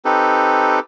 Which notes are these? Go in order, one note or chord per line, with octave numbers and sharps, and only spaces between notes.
C4 D#4 G4 A4 B4